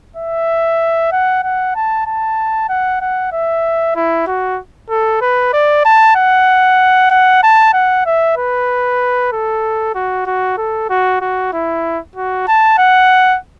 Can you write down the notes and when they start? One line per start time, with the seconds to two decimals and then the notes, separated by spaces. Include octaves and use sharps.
0.16 E5
1.12 F#5
1.43 F#5
1.75 A5
2.06 A5
2.69 F#5
3.01 F#5
3.32 E5
3.96 E4
4.27 F#4
4.89 A4
5.21 B4
5.53 D5
5.85 A5
6.16 F#5
7.11 F#5
7.43 A5
7.73 F#5
8.06 E5
8.37 B4
9.32 A4
9.95 F#4
10.26 F#4
10.58 A4
10.89 F#4
11.21 F#4
11.53 E4
12.16 F#4
12.48 A5
12.78 F#5